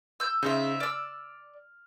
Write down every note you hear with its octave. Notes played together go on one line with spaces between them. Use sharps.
E6 G6
C#3 D#4 C5 E5
D5 E6 F6